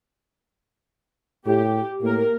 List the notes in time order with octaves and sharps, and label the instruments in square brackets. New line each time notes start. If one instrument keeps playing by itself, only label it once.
[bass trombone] A2 [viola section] G4
[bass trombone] A2 [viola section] A#3 A#4